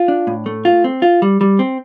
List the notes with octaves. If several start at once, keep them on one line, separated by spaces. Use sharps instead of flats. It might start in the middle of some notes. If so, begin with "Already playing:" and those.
Already playing: F4
D4
A2
A3
F4
C4
F4
G3
G3
C4